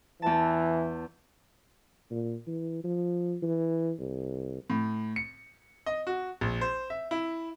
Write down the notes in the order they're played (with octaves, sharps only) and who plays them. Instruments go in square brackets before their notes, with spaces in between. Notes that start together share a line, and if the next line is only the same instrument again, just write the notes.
[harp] E2 A5 [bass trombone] E3
[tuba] A#2
E3
F3
E3
C2
[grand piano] A2
C#7
D#5
F#4
A#1
C5
E5
E4